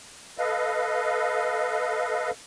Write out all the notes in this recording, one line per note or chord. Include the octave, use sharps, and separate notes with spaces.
A4 B4 D#5 F5